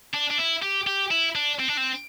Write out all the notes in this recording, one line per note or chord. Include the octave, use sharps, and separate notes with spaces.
D4
D4
E4
G4
G4
E4
D4
C4
D4
C4